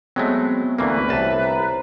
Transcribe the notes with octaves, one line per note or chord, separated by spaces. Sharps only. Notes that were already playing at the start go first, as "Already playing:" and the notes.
F#3 G#3 A3 B3 C4
D2 E3 A3 A#3 B4 C#6
C2 C#5 E5 A5
C5 A#5